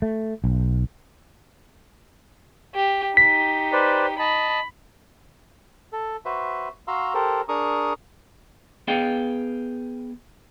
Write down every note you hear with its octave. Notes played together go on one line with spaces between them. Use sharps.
A3
B1
G4
D#4 G4 B6
B4 C5 D5
D#5 A5 B5
A4
F#4 B4 C5 E5
F#4 F5 A#5 C6 E6
G4 A4 A#4 C5
D4 G#4 A#4 A#5 C#6 D#6
B3 G#4 F5 G5